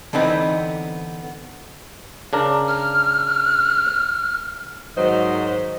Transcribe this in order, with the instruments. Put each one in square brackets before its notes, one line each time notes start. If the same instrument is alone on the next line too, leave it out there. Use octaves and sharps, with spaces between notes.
[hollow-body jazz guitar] D3 E3 B3 C4 D#4 B4
[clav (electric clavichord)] C#3 D4 A#4
[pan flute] F6
[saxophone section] G#2 D#3 F#3 C5 D#5